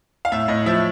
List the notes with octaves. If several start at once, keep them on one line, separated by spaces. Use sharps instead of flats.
F5
A2 E5
A2 D#5
F3 E5